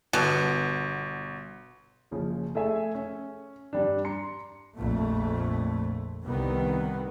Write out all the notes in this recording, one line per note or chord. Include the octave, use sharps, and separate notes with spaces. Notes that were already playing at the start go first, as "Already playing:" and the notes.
G1 B2
F#1 C#3 F3
A3 G#4 E5 G#5
C#4
G2 G3 D4
A#5 C6 C#7
A#1 F2 A3
C2 C3 D#3 B3